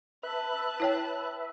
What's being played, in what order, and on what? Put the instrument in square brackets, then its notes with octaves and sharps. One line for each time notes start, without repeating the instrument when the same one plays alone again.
[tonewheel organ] B4 E5 [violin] A5 F#6
[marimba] E4 C#5 G5